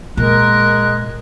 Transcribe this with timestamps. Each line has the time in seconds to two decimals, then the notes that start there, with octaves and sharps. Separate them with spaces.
0.17 A#2 G#3 A#4 F#6